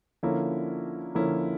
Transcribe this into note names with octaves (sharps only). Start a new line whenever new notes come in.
D3 F3 A#3 C#4 E4
D3 F3 A#3 C#4 E4